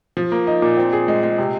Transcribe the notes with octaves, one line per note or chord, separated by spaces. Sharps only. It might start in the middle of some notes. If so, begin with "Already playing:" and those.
F3
A#3
D#4
A#2
C4
G#4
G#3
G#3
C3